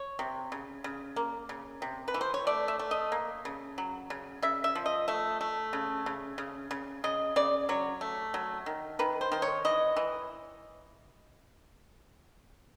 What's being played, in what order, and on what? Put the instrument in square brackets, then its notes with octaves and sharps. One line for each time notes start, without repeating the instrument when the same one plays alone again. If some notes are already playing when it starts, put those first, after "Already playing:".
Already playing: [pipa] C#5
C3
C#3
C#3
A#3
C#3
C3
B4
E3
C5
C#5
A3 D5
E5
A3
D#5
A#3
C#3
F#3
C#3
C#3 E5
E5
F3
D#5
A3 E5
A3
C#3
C#3
C#3
C#3
C#3 D#5
C#3 D5
F#3 C#5
A3
F#3
D#3
D#3 B4
C5
D#3 C5
C#5
E3 D#5
E3